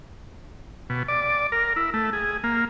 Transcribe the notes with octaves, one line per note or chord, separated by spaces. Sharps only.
B2
D5
A#4
E4
A3
G#4
A#3